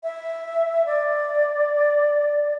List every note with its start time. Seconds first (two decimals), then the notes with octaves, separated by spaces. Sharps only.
0.03 E5
0.86 D5